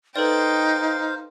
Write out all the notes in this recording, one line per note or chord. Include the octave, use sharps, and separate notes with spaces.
D#4 A4 B4 C5 D5 F5 G5 A6